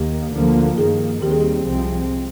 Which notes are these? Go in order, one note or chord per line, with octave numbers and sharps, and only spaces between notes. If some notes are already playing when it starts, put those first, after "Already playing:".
Already playing: D#2 D#3 A#3 G4
D2 D3 F3 A#3
G2 D#3 A#3 G#4
D#2 D#3 G3 C4 G4
G#4
G4
C2 C3 F3 G#3 C4